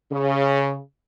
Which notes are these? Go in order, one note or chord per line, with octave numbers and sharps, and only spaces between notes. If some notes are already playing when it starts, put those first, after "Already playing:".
C#3